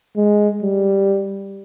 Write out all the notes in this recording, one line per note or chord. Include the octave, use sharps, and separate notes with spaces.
G#3
G3